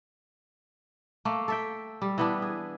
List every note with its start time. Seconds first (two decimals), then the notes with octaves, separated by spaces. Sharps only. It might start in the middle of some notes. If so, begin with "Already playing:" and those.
1.25 A3 A#3
1.48 A4 E5 G5
2.02 G3
2.18 E3 B3 D4
2.42 G#4